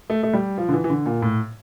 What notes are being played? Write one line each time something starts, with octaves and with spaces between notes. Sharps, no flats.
A3
A3
G3
F3
D3
E3
E3
D3
A#2
A2